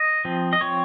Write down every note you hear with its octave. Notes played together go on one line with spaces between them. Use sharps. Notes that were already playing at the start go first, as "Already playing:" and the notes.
Already playing: D#5
F3 C4
D#5
F3 C4 C#5